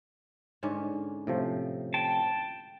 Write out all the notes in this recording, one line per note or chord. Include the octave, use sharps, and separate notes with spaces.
G#2 D3 C#4
A2 C3 F3
G5 A5